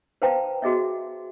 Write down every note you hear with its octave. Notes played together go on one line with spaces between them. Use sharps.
B4 C5 F5 G5 A5 A#5
F#4 G#4 D#5 E5